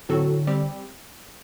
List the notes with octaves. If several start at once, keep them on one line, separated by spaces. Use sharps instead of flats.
A2 D3 F#3 C4 F#4 A4
G3 C4 G4